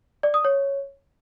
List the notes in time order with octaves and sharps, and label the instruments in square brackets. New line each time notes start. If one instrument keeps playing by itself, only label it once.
[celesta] D5
D#6
C#5